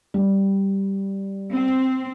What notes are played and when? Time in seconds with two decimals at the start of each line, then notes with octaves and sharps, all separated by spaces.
0.14 G3
1.52 C4